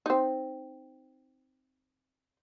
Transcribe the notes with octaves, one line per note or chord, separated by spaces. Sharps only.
C4 D#4